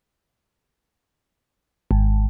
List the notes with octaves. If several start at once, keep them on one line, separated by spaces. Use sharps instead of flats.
G#1